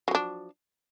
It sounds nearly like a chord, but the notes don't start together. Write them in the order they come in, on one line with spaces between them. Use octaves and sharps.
F#3 F3 D4